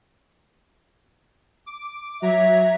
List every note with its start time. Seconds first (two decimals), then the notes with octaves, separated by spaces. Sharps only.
1.66 D6
2.22 F#3 E5 A#5 G#6